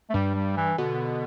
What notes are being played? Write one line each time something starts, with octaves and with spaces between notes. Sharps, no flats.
A3
G2 G3
G3
E3
B2 D3